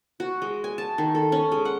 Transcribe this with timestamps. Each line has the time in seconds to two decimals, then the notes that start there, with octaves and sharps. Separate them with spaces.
0.20 F#4
0.42 G#3
0.64 G#5
0.78 A5
0.98 D#3
1.15 A4
1.32 C#4
1.52 G#3
1.65 F#5